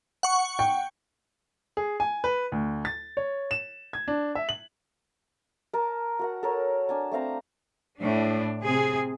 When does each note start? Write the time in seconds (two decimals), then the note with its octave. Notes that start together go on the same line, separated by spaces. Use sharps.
0.23 F#5 C#6
0.59 G5
1.77 G#4
2.00 G#5
2.24 B4
2.52 D2
2.85 A6
3.17 C#5
3.51 E7
3.93 G#6
4.08 D4
4.35 E5
4.49 F#7
5.73 A#4 A5 D6
6.19 F#4 A#4 F#5
6.43 A4 A#4 C#5
6.89 D4 G#5 A5
7.12 A3 C4 F5 A#5
8.00 A2 D4
8.64 C3 C4 G#4